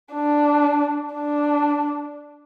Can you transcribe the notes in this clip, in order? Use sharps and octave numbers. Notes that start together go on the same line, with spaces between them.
D4
D4